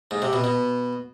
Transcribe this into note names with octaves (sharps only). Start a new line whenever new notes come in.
G#2
C3
B2
B2